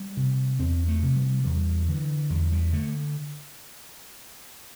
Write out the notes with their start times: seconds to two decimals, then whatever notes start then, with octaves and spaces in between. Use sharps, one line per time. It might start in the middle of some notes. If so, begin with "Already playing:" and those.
Already playing: G3
0.17 C3
0.59 E2 C4
0.88 A3
1.03 C3
1.16 G3
1.44 E2 G3
1.88 D3 E3
2.30 E2 G3
2.52 G3
2.72 D3 A3